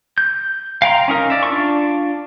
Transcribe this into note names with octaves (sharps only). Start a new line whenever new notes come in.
G6
F5 G5 A#5 C6
C#4 D#4 A#4
D5 E5
D4 F4 D5 C#6